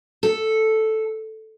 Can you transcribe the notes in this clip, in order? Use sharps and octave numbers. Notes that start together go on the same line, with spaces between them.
A4